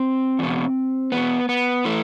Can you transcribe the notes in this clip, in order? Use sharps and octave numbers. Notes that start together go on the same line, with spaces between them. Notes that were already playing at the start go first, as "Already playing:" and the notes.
Already playing: C4
E2 B2
E2 B2 B3
B3
E3 A3